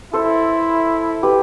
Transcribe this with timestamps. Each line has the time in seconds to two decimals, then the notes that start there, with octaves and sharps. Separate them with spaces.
0.13 E4 A4 C5
1.23 G4 B4